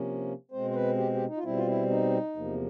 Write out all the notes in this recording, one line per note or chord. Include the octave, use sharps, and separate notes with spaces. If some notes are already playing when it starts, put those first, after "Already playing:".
Already playing: C3 F3 A#3 C#4
B2 G#3 C4 C5
C5
B4
G4
G4
D#4
F4
B2 G3 C4 E4
F4
E4
D#4
E2 C3 F3 A#3